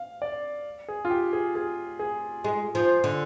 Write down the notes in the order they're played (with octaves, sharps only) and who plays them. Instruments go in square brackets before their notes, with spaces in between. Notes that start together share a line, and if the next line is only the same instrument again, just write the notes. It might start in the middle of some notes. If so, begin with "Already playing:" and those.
Already playing: [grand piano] F5
D5
G#4
F4
G4
G#4
G#4
G#4
[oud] G#3
F3
D3